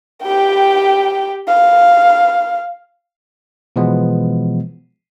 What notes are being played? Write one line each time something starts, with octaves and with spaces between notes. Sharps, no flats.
G4 G5
F5
B2 E3 F3 G#3 B3